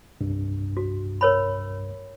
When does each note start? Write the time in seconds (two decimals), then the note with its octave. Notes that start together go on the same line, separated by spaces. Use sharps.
0.21 C2 G2
0.77 F#4
1.21 A#4 C#5 B5